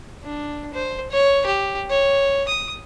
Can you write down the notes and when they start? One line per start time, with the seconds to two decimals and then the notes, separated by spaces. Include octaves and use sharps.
0.23 D4
0.74 C5
1.11 C#5
1.46 G4
1.90 C#5
2.48 D#6